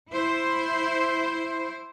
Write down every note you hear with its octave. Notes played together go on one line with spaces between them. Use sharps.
E4 C5